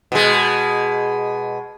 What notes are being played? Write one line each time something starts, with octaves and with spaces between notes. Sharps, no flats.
B2 G#3